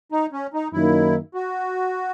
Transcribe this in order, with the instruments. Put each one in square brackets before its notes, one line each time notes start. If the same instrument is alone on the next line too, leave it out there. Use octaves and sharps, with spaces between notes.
[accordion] D#4
C#4
D#4
[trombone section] F#2 D#3 A#3 D#4 [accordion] E4
[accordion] F#4